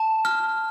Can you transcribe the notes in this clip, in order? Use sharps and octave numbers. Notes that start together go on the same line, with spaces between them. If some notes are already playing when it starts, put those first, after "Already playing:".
Already playing: A5
F6